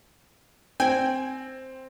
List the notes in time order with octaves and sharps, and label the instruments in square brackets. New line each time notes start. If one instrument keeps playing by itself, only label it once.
[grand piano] C4 [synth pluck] G5 G#5